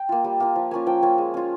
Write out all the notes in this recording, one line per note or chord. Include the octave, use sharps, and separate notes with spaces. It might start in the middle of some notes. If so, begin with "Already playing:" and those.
Already playing: G5
A#3 F4
G3
A#3 F4
F3
A#3 C#4 F4 G#5
F3 G5
A#3 C#4 F4 G#5
G#3
C#4 F4